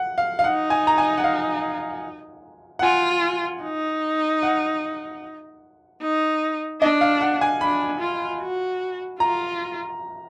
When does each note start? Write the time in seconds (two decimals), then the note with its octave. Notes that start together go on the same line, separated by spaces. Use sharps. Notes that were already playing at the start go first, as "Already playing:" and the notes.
Already playing: F#5
0.18 F5
0.39 F5
0.44 D#4 F#5
0.70 G#5
0.87 A#5
0.98 G#5
1.17 F#5
1.24 F5
2.79 F#5
2.83 F4 G#5
3.63 D#4
4.43 F#5
6.02 D#4
6.81 D4 D#5
7.01 F5
7.21 F#5
7.41 G#5
7.61 D4 B5
8.01 F4
8.41 F#4
9.20 F4 A#5